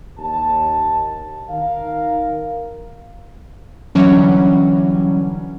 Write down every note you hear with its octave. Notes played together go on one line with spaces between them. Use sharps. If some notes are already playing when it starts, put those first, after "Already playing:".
D#2 A5
D#3 A#4 F5
D3 E3 F#3 G3 C#4